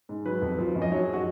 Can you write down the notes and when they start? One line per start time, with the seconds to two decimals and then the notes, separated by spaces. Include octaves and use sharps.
0.09 G#2
0.25 F#3 B4
0.42 F2
0.58 F3
0.75 F#2
0.82 D#5
0.91 F#3 C#5
1.03 G#4
1.14 F#4